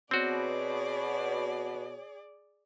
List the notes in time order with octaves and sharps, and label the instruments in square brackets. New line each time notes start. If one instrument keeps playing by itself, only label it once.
[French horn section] B2 [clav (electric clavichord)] C4 F#4 [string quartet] G#4 D5 [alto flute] C#5